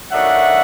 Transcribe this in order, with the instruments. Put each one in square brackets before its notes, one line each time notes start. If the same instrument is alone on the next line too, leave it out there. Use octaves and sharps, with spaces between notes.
[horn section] F#2 D#3 F#3 A3 D4 E5 F#5